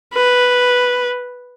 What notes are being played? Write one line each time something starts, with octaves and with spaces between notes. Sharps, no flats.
B4